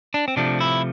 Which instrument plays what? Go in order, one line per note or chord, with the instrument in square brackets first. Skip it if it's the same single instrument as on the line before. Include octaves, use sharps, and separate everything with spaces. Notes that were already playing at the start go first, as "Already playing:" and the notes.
[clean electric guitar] D4
C4
C3 F3 A3 D4
E4